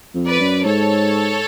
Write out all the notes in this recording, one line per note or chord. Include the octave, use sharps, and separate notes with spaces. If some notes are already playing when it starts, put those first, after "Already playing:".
F2
B4 D5
F#2
G#2 A4 C#5